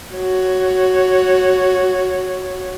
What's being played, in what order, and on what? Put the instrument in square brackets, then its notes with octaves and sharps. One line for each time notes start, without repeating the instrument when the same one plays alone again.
[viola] F#4 C#5